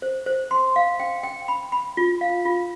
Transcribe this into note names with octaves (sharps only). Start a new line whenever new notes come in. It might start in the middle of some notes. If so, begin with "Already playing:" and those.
C5
C5
C6
F5
G5
G5
B5
B5
F4
F5
F4